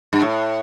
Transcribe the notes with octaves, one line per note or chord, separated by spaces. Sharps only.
G2
A2